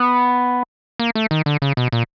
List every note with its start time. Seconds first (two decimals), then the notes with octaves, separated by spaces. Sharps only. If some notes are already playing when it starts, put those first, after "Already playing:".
Already playing: B3
1.00 A#3
1.15 A3
1.31 D#3
1.46 D3
1.62 C#3
1.77 B2
1.92 A#2